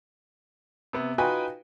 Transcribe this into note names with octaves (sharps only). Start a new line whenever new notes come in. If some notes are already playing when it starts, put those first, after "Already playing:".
C3 B3
D#4 F4 F#4 B4 G5 G#5